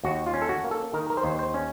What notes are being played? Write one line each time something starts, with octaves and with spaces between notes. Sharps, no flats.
D#2 F#4
F4
C#4
A4
F#4
A#3
A4
D#3 A#4
A#4
C5
D#2
C5
C#4